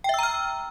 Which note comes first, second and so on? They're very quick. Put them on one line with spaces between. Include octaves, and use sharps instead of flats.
G5 E5 E6 A#5 F6